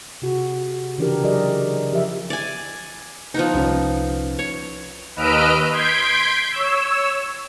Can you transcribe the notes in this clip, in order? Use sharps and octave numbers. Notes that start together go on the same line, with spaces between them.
C3 F#4 G#4
C#3 E3 D4 G4 A#4
F#3 G4 G#4 A#4 D5 D#5
F3 G4 A#4 E5
D5 G#5
F3 B3 D#4
C2 C#4
C#5
D#2 B4 D#5 E6 F6 D7
C6 G6 G#6 B6 D7
C#5 E6